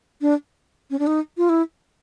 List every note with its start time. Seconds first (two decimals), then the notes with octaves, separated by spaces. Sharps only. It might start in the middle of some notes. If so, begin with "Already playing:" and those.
0.21 D4
0.91 C#4
0.99 D4
1.07 D#4
1.38 F4
1.49 E4